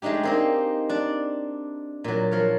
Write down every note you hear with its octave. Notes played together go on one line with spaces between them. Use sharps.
G#3 A3 D4 D#4 G4
A#3 C4 D#4
D4 D5
A#2 F#3
F3 A#4 C#5